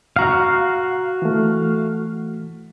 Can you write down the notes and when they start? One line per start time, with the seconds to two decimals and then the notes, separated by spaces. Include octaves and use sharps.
0.16 F#4 F5 F#5 A#5
1.22 E3 A3